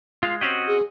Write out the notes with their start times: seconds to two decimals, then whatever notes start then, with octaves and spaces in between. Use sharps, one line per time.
0.23 G#3 F4 F5
0.41 C4 C#4 F#4 G4 D#5
0.67 G#4